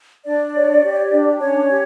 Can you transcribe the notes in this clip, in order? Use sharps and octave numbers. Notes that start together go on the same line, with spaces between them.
D4 D5
C#5
G4
D4
C#4 C#5
G4